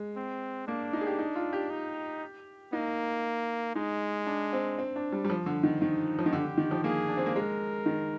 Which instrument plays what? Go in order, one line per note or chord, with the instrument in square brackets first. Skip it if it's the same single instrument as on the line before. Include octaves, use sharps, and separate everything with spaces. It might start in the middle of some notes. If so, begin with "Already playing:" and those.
Already playing: [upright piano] G#3
[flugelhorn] C4
[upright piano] A#3 [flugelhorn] D4
[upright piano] D#4
G#4
G4
D#4
F4
G4
[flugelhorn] D#4
[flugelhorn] A#3 [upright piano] D#4
[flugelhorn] G#3 [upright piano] D#4
[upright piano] D4
C4
C4
D4
G3
G3
F3
D3
D#3
[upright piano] D#3 [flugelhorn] D#4
[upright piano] F3
D#3
[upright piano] D3 [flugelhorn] G4
[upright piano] D3
D#3
F3
[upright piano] A#3 [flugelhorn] G#4
[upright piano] D4
C4
A#3
[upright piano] G#3 [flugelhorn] A#4
[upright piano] D#3